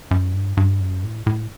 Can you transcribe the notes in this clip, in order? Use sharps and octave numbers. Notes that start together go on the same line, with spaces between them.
F#2
G2
G2
F#2
A2
A2